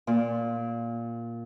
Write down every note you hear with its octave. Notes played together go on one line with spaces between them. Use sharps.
A#2